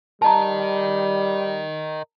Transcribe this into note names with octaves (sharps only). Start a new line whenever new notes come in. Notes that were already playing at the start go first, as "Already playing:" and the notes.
G3 A#4 D#5 A5 A#5